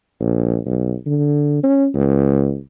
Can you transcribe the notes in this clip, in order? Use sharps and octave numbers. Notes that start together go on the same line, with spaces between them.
A#1
B1
D3
C#4
C#2